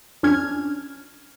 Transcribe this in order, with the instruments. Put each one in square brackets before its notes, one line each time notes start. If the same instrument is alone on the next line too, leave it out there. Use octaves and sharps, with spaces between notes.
[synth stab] F2 C#4 D4 F6 G#6